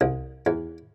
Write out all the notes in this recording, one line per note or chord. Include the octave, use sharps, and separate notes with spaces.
C2
E2